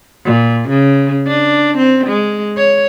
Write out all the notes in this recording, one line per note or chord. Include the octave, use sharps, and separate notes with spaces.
A#2
C#3
D4
C4
G#3
C#5